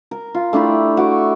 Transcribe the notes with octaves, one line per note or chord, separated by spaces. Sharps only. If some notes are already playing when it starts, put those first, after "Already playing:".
A#4
F4
A3 D4 E4 G4
F#4 D6